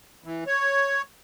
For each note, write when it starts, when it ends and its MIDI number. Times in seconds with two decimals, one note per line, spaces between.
0.24 0.44 52
0.47 1.02 73